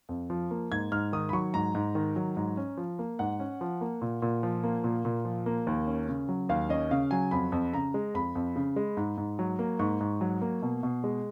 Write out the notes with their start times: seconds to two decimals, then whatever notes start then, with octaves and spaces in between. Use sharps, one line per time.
0.09 F2
0.30 F3
0.51 A#3
0.71 G#2 G#6
0.92 G#2 F6
1.13 D#3 D#6
1.29 B5
1.33 F#3 C#6
1.54 G#2 A#5
1.75 G#2
1.95 D#3
2.16 F#3
2.37 G#2
2.57 C#4
2.77 F3
2.99 A#3
3.19 G#2 F#5
3.40 C#4
3.61 F3
3.81 A#3
4.02 A#2
4.22 A#2
4.43 F3
4.64 A#3
4.84 A#2
5.05 A#2
5.25 F3
5.46 A#3
5.67 D#2
5.87 C#4
6.08 C#3
6.29 F#3
6.49 D#2 F5
6.69 C#4 D#5
6.91 C#3 F5
7.11 F#3 G#5
7.31 F2 B5
7.52 F2
7.73 C#3 A#5
7.94 G#3
8.14 F2 B5
8.35 F2
8.56 C#3
8.76 G#3
8.97 G#2
9.17 G#2
9.39 F#3
9.59 A#3
9.79 G#2 C#6
10.01 G#2
10.21 F#3
10.41 A#3
10.62 B2
10.83 B2
11.04 G#3